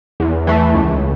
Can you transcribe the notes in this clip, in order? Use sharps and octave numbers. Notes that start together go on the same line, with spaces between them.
E2
E3 A3
C#2